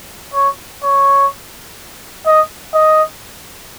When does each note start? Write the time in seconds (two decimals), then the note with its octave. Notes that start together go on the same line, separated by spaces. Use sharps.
0.34 C#5
0.83 C#5
2.27 D#5
2.74 D#5